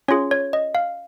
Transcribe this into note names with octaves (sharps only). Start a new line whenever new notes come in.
C#4 F4 G#4 C#5
C#5
D#5
F5